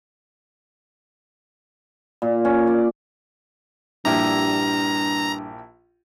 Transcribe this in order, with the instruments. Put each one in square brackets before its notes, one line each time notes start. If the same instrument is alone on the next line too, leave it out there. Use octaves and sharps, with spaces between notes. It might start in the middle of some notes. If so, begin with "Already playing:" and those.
[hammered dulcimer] A#2
C#4
D5
[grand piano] A#1 E4 G4 [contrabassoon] G2 [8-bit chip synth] A#5